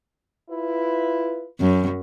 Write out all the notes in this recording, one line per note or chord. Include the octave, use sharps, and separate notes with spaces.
E4 F4 B4
F#2